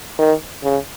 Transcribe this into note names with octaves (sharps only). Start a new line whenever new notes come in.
D#3
C#3